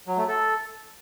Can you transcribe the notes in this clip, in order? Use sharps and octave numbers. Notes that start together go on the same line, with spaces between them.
F#3
A3
A4